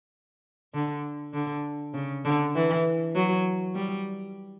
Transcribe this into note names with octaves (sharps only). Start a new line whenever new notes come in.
D3
D3
C#3
D3
E3
F#3
G3